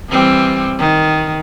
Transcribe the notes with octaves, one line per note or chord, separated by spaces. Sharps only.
E3 G3 C4
D#3